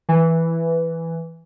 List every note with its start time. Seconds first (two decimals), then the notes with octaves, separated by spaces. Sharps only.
0.09 E3